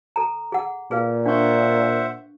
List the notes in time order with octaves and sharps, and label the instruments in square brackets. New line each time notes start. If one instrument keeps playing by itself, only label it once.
[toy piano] A4 A#5
G#4 F#5
[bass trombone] A#2 [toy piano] G#4 B4 F5
[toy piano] D4 C#6 [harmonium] C5 E5 F#5